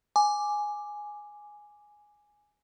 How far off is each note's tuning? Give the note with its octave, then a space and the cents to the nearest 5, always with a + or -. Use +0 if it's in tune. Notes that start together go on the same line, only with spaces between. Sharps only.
G#5 +0 D6 +0